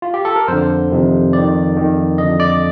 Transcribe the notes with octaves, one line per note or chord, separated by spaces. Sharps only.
F4
G4
A4
A#4
F2 D3 C5
F2 C3 D#3
F2 D#3 D5
F2 D#3
F2 D3 D#5
D5